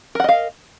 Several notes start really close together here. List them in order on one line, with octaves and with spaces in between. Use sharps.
A#4 F#5 D#5 F5